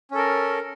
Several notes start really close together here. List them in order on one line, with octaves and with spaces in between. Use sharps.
C#4 A4 A#4